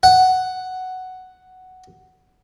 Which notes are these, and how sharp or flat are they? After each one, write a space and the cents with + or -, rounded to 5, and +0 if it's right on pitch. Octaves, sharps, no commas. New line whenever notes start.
F#5 +5